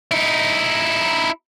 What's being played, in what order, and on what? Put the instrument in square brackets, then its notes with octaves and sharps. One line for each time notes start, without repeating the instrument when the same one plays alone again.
[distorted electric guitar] D#4 E4